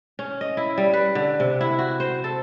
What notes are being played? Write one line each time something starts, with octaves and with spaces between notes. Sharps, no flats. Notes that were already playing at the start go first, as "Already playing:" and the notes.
C#4
D#5
E4
G3
B4
D3
C3
E4
F#4
C5
A4